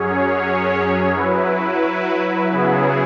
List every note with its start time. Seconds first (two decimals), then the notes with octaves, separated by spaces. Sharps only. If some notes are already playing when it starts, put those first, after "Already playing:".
Already playing: F#2 F#3 C#4 G#4 C#5
1.14 F#3 E4 B4
2.51 C#3 F#3 B3 E4 G#4